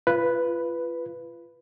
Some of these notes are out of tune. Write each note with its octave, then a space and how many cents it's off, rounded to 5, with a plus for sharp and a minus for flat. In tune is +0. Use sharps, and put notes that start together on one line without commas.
F4 -30 B4 +0